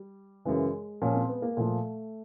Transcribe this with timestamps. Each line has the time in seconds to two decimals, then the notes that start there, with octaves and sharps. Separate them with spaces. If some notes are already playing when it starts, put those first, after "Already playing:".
Already playing: G3
0.45 F#2 C#3 E3 G#3
1.02 A#2 F3 C#4
1.15 C4
1.29 B3
1.42 A#3
1.57 A#2 F3 A3